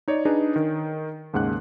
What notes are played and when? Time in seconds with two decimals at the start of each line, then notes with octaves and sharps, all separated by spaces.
0.08 D#4 C#5 D5
0.25 D4 D#4 G#4 B4
0.56 D#3
1.33 D#2 G#2 C#3 F#5 F#6